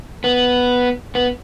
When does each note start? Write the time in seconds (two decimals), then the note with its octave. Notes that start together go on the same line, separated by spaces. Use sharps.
0.24 B3
1.15 B3